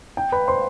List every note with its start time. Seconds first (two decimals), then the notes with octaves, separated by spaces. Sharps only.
0.17 G5
0.32 B4 B5
0.48 C5 C6